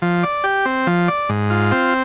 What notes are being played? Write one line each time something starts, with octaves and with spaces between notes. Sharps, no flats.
F3
D5
G4
C4
F3
D5
G#2
F4
C4